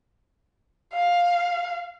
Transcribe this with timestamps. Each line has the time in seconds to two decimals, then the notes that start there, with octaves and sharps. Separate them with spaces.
0.94 F5